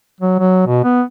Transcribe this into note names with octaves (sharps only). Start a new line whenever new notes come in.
F#3
F#3
B2
B3